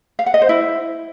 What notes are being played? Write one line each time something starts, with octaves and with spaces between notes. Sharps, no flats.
F5
F#5
D#5
C5
E4